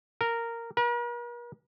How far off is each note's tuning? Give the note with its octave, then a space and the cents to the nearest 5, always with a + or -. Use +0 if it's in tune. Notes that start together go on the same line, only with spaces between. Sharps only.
A#4 -10
A#4 +45